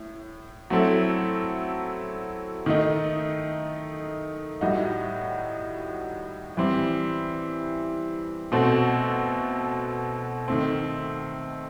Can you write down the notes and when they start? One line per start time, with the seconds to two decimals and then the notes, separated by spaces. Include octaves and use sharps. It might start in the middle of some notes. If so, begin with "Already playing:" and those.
Already playing: A2
0.70 F#3 A3 C4 E4 A4
2.66 D#3 A3 D#4
4.61 A2 G3 D#4 F#4
6.57 E3 G3 C4
8.52 B2 A3 C4 F#4 A4
10.48 D#3 A3 C4